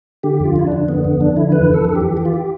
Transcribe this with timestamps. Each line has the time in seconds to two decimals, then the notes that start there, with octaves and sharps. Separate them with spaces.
0.23 D3 G4
0.40 F2
0.45 F4
0.56 F2 E4
0.67 D3 D4
0.88 D3 B3
1.04 F2 B3
1.21 F2 D4
1.36 D3 E4
1.52 E3 B4
1.69 F2
1.74 A4
1.85 F2 A4
1.96 G4
2.01 E3
2.17 E3 G4
2.25 F4
2.34 G4